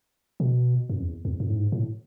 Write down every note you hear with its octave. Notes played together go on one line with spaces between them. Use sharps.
B2
F#2
E2
E2
F#2
A2
G#2
A2